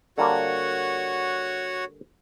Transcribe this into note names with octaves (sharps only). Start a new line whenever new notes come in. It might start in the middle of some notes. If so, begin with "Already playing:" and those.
D3 G3 A#3 F#4 C#5 F#5